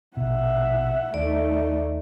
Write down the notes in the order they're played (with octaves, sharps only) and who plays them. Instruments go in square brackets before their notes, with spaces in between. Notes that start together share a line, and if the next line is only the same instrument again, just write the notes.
[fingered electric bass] A#1 B2 [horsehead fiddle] E5 F#5
[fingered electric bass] D#2 [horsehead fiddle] A3 D#4 [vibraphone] D5